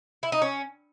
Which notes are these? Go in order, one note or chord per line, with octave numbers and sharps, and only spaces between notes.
E4
D#4
C#4